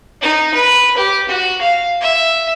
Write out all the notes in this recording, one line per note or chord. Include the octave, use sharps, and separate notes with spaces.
D#4
B4
G4
F#4
F5
E5